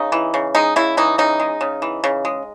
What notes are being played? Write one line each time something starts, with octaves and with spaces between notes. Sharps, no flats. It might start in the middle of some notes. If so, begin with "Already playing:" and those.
Already playing: C#3 D#4
E3
C#3
G#3 D#4
C#3 E4
E3 D#4
C#3 D#4
G#3
C#3
E3
C#3
G#3